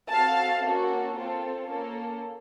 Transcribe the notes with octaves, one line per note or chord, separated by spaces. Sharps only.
C4 F#4 A4 F5 A5
A#3 C#4 F#4 A4
C4 F4 A4
A#3 C#4 A4